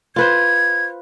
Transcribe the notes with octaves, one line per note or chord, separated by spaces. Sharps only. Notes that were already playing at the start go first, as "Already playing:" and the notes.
F4 B4 C5 G#6